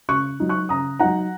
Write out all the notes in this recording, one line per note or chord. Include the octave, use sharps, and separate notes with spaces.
C#3 C#6 F#6
F#3 D#4
C#6 F#6
C#3 A#5 D#6
F#3 D#4 F#5 A#5